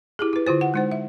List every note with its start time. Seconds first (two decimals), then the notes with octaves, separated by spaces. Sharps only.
0.19 E4 G4 G#4
0.33 E4 B4
0.47 D3 E4 F4 C5
0.61 F#5
0.74 G#3 D#4 C5
0.92 E5